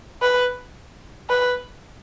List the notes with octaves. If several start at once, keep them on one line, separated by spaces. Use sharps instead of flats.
B4
B4